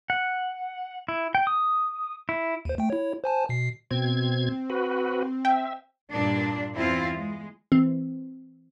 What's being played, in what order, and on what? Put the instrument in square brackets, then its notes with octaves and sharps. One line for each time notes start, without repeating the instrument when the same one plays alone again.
[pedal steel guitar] F#5
E4
G5
D#6
E4
[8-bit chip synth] D#2 C5
A3 G5
E4 C#5
C5 G#5 A5
B2 C7
[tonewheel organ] B2 G#6 [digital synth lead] C4
[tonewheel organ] F#4 B4
[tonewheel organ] E5 [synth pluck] G5
[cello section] G2 A#2 D4
E2 C4 E4 F4
G#3
[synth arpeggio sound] E3 C4